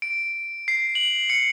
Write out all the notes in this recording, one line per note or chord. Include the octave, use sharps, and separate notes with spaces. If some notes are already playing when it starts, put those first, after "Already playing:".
D7
C7
F#7
C#7